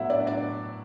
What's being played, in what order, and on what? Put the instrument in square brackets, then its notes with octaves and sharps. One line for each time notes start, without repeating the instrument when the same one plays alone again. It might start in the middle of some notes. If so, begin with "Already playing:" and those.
Already playing: [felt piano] A2 F#3 B3 E4 F#4 E5 F#5
D4 D5
D4 D5